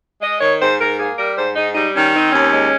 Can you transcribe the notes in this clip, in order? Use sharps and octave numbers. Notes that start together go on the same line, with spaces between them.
G#3 D#5
D#3 C#5
G#2 C5
G#2 A#4
A#3 G#4
G3 A#4
G#2 C5
G#2 D#4
G3 D#4
D#3 C#4
C4 D#4
D#2 C#4
G#3